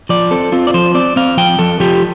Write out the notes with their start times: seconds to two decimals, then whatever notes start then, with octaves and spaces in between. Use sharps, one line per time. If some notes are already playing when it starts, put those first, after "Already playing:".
0.09 F3 D5
0.31 C4 A4
0.52 C4 F4
0.67 D5
0.74 F3 C5
0.95 C4 D5
1.16 C4 F5
1.37 F3 G5
1.59 F3 A4
1.80 F3 G4